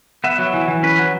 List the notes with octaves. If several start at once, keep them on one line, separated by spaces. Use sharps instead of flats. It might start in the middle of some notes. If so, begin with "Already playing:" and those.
B3 E5
F#3
E3
E3
C#4 B4
F#3